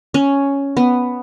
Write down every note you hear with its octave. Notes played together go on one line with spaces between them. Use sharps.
C#4
B3